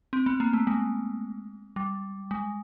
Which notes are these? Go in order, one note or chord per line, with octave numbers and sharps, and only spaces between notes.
C4
B3
A#3
A3
G#3
G3
G#3